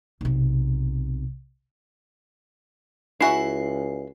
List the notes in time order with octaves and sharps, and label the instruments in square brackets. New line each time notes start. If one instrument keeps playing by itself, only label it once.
[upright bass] B1 C3
[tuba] C#2 [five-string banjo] E4 F#4 E5 [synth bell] G#5 C7